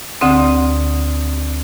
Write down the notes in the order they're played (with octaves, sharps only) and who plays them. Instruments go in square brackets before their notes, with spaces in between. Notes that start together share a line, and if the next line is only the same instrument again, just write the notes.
[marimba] D2 D3 C4 D#6